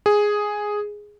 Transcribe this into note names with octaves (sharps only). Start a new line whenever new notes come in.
G#4